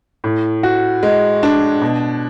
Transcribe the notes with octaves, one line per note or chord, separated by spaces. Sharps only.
A2
F#4
G#3
D4
B2